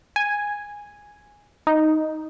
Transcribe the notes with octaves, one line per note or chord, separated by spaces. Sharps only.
G#5
D#4